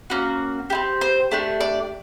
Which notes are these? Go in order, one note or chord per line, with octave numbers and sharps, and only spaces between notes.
A#3 C#4 F#4
C4 E4 G4
C5
A3 D4 G4
D5